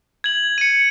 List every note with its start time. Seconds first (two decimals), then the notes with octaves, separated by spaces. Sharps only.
0.24 G#6 F#7
0.58 C#7 D#7